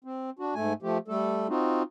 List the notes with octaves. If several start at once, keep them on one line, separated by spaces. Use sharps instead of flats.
C4
D4 F#4
G#2 A3 G#5
F3 A3 G4
G3 A3 A4
C4 D#4 F4 F#4